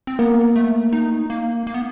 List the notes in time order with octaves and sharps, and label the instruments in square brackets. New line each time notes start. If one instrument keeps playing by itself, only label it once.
[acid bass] C4
[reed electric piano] A#3 [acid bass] B3
[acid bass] A3
D#4
A#3
A#3
B3